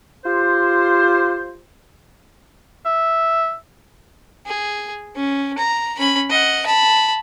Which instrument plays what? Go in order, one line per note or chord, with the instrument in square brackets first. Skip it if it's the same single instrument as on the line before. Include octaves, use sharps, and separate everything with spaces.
[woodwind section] F4 G4 C5
[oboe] E5
[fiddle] G#4
C#4
A#5
C#4 B5
D#5 F#5
A5 B5